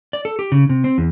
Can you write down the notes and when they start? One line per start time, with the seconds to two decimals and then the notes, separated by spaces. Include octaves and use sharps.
0.13 D5
0.25 A4
0.39 G4
0.52 C#3
0.69 C3
0.84 C4
0.98 E2